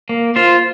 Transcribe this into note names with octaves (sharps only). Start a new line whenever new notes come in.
A#3
F4 C5